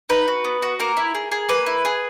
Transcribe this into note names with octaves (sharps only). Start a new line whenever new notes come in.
D#4 B4
F#4
B3
F#4
A#3 A#4
E4
G#4
G#4
A#3 B4
E4
G#4